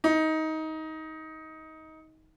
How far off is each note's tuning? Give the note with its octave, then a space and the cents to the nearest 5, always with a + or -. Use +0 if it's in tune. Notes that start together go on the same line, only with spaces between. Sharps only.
D#4 +20